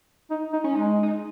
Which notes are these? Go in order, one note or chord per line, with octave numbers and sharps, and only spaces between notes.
D#4
D#4
C#4
G#3 D#4
D#4